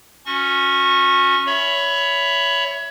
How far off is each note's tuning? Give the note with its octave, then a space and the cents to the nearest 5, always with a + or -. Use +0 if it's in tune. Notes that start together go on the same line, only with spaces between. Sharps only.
C#4 +0 F#4 -25 C#6 -25
C#5 +20 E5 +5 B5 +5